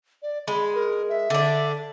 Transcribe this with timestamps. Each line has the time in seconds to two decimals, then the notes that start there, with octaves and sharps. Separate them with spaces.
0.23 D5
0.48 G#3 B5
0.75 A#4
1.09 E5
1.30 D3 D4